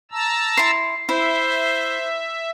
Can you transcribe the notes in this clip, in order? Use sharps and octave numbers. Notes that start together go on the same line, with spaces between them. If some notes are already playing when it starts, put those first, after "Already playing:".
A5 A#5 E6
E4 C6 C7
E4 C5 E5